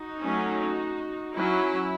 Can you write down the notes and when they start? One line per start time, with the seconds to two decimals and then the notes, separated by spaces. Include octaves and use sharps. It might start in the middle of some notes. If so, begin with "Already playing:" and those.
Already playing: D#4 F#4
0.21 F#3 A3 C#4
1.35 F#3 C#4 E4